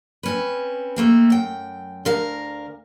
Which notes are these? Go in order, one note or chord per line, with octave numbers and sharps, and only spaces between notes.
C4 C#4 B4
A3 A#3 C4
F#2 G5
D2 A#4 F5